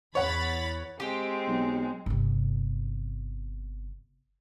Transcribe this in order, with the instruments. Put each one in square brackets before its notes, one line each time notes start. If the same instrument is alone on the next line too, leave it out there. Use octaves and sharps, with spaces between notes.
[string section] E2 B5 A6 [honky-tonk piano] C#5 F#5
[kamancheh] G#3 C4 [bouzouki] G4 C5
[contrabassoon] B1
[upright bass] G1 C3